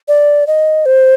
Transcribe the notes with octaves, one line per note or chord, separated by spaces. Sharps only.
D5
D#5
C5